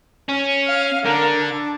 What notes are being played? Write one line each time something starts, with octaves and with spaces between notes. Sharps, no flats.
C#4
F5 F6
D3 D4 A#4
D4 A5